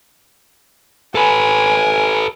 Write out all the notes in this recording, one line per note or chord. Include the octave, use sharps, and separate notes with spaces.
A4 B4 G#5